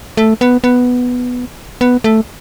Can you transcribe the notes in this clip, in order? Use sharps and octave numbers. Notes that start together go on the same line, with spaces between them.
A3
B3
B3
B3
A3